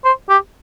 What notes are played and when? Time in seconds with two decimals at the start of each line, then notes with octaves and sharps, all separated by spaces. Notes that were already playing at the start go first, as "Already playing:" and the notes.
0.04 C5
0.29 G4